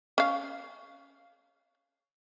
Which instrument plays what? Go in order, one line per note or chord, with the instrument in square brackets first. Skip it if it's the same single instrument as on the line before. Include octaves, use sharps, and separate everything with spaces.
[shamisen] C#4 F5